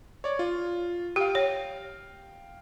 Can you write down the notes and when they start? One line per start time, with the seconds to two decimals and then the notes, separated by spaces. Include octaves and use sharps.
0.24 C#5 D5
0.39 F4
1.16 G4 F5 G5
1.35 C#5